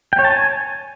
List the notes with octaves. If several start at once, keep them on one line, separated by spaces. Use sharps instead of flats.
G5
C#5
A5
G#5